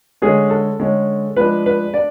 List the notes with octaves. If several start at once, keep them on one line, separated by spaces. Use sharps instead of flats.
D3 G#3 C#4 G#4
A4
D3 G#3 C#4
F3 G#3 D4 B4
B4
D4 D5